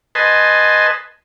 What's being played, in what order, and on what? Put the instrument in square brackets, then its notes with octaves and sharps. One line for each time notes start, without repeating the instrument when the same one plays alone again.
[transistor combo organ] B4 D#5 G#5 A5 C6